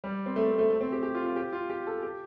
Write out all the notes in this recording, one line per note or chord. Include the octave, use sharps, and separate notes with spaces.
G3
C4
A3
C4
A3
A3
C4
G4
G4
F4
F4
G4
F4
G4
A4
G4